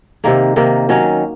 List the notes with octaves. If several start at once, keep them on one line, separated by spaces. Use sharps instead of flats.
C3 D#3 A#3
C3 D#3 A#3
D#3 F#3 C#4